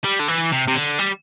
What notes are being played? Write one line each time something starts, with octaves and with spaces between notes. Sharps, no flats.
G3
D3
E3
C3
C3
D3
G3